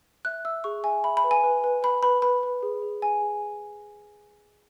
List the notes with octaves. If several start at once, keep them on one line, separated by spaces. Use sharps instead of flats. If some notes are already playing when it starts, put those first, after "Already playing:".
E5 F#6
E5 E6
G#4 C#6
E5 G#5
E5 B5
B5
B4
G#5
B4
B4
B4 B5
B4 B5
B4 B5
B4
G#4
G#4
G#4 G#5
G#4